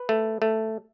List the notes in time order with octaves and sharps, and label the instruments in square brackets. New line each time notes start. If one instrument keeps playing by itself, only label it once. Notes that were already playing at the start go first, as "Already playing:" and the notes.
Already playing: [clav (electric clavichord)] B4
A3
A3